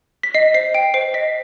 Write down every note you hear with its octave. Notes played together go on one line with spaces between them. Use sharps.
B6
D#5 C7
C5 C7
G5 D7
C5 C7
D#5 B6